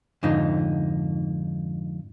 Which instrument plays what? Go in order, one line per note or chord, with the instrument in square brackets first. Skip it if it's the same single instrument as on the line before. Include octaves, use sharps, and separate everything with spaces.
[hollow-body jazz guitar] F2 G#2 D3 D#4